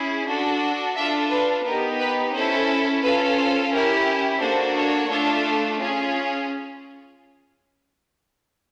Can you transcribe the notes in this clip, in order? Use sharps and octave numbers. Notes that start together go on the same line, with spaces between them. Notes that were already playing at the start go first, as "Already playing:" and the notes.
Already playing: C#4 E4 G#4
D4 F#4 A4
D4 F4 A4 E5
B4
B3 D#4 G4 A#4
B4
C#4 E4 A4 C5
C#4 F4 A4 B4
C5
C#4 E4 G4 A#4
A#3 D4 F#4 A4 C5
C#5
A3 D4 F4 A4
C#4 F4 G#4